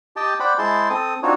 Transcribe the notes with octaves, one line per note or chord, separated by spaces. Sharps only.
G4 D#5 G5 A5
C5 D5 F#5 G5 B5
G#3 E4 G#4 C5 A5 C6
C4 A4 D#6
C4 D4 D#4 F4 F#4 C#5